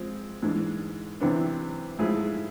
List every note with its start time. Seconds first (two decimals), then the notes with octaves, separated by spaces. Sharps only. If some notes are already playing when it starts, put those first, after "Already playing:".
Already playing: F3 G#3 C4
0.42 G#2 E3 G#3 D4
1.20 C3 E3 B3 D4
1.99 G#2 F3 A3 E4 G#4